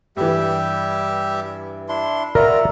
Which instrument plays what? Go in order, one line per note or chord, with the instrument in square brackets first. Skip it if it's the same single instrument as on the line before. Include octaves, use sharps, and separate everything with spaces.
[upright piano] G2 E3 [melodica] G3 G4 E5
[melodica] D4 E4 C6
[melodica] F4 F#4 A#5 [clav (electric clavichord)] A#4 [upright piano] D5 [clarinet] E5